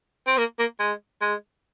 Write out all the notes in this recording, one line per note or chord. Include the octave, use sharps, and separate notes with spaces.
C4
A#3
A#3
G#3
G#3